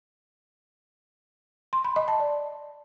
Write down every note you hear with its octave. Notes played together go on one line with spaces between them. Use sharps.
C6
B5
D#5
A5
D5